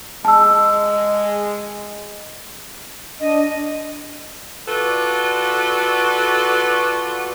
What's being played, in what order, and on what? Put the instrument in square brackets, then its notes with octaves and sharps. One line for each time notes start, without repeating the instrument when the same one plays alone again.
[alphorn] G#3 [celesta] A5 E6
[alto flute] D4 [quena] D#5
[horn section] F4 F#4 A4 B4 D5